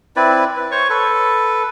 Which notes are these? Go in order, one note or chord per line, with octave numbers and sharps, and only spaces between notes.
C4 E4 B4 D5
B4
C5 C#5 C#6
A4 B4